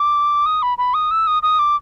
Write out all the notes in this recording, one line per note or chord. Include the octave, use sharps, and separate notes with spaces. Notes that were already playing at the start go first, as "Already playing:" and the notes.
Already playing: D6
D#6
B5
B5
D#6
E6
D#6
D#6
D6